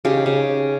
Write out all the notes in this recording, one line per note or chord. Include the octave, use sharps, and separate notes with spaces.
C#3 D#4 G4
C#3